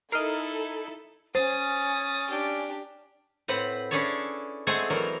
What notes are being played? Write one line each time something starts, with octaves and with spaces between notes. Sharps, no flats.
D#4 E4 A4 A#4 D#5 F6 C7
C#4 C5 D#6 A6
D4 G4
A2 C4 B4 F#5
C#4 D4 E4 G#4 A4 C#5
G#3 A3 C4 G#4 F#5 G#5
E3 F#3 A#4